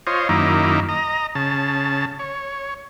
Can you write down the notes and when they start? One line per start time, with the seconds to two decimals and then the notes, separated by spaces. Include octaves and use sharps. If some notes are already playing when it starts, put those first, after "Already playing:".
0.07 F4 C5 C#5 D#5
0.29 F#2 D#3 A#3 D#4 E4 D6
0.89 D#5 A#5
1.35 C#3 A5
2.19 C#5